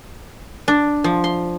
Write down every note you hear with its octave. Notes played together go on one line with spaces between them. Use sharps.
D4
F3
C6